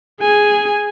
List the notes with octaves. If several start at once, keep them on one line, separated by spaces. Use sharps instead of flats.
G#4 G#5